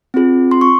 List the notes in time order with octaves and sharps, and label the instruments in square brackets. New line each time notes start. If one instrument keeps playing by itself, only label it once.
[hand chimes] C4 F4 G#4
C6
C#6